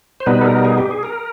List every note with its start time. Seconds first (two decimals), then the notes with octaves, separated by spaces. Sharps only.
0.20 C5
0.26 B2 G3 B3 D#4 B4
0.41 A4
0.46 A#4
0.65 G#4
0.78 G4
0.91 G#4
1.03 A#4